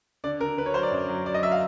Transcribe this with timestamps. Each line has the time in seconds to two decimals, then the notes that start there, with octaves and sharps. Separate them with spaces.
0.24 D3 D5
0.40 D3 A#4
0.57 D3 B4
0.66 C#5
0.74 F#3 C5
0.83 D5
0.91 F#2
1.09 F#3
1.25 F#3 D5
1.34 D#5
1.42 F#3 E5
1.51 F5